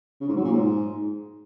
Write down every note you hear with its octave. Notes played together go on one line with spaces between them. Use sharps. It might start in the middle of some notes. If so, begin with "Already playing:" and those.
C#3
G#2
F#3
A#2
G#2